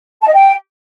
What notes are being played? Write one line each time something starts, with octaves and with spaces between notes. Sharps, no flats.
A5
D#5
G5